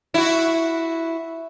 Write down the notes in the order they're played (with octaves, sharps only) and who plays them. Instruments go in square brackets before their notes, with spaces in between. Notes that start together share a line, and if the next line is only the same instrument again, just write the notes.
[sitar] E4 F#4